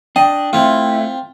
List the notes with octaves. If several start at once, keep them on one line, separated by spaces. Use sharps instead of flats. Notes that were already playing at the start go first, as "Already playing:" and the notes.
D4 D#5 G5
A3 C4 E4 F4